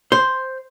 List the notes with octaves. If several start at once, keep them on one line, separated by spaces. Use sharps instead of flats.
C5